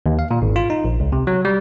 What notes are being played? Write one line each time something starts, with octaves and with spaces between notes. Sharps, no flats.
D#2
F5
A#2
G#1
F4
D#4
A#1
C#2
C3
F#3
G3